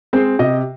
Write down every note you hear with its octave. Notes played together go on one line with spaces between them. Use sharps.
G#3 C4 C5
C3 D#5